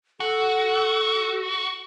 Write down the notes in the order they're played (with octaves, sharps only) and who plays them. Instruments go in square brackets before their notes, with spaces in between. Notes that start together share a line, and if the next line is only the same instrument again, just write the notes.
[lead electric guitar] F#4 [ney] A4